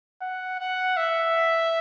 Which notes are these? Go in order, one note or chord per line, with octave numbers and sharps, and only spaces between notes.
F#5
F#5
E5